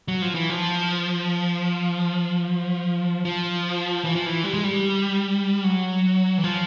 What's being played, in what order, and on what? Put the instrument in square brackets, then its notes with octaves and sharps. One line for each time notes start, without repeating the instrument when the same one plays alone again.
[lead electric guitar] F#3
F3
E3
F3
F3
E3
F3
E3
G3
G#3
G3
F#3
E3
F3